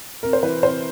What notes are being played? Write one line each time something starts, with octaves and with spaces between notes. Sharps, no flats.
C3 A#4
C5
E3 B4
C3 C5